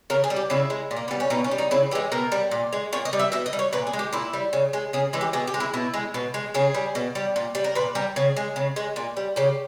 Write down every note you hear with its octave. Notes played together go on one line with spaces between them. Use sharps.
C#3 A#4
G#4
G3
G4
C#3 E4
G#3
A#2
A#3
G3 B3
C#4
B2 D#4
C#4
G3
D#4
C#3 E4
E3 G#3 G4
B2 A#4
G3
A#2
G#3
A#2 C#5
D#5
G3
E5
B2 E5
D#5
G3
C#5
A#2 B4
G#4
G#3
G4
A#2 E4
G3
C#3
G#3
C#3 G#4
E3 G#3
G4
B2 G#4
G4
G#3
E4
B2 E4
G#3
B2
G#3
C#3 G#4
G3
B2
G3
A#2
G3
A#4
A#2 B4
G3 A#4
C#3 G#4
G#3
C#3
G#3
A#2
G3
C#3 G4